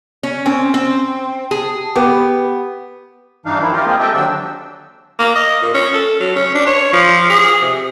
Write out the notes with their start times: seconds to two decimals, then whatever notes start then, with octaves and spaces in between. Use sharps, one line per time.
0.23 C#4
0.46 C4 C#4 G#5
0.74 C4
1.51 G#4 A5
1.95 B3 G4 B4
3.46 G2 E3 D4 D#4 F5
3.59 D#3 F3 A#3 E4
3.73 F4 G4 A#4
3.87 G#3 A#3 C4 F4 G#4
3.99 G4 A4 D#5 E5 G5
4.14 D#2 D3 F#3 C4 D4 E6
5.19 A#3
5.35 D#5
5.62 A#2
5.74 C#4
5.94 A4
6.20 F#3
6.35 C#4
6.55 D4
6.66 C#5
6.93 F3
7.30 G#4
7.62 C3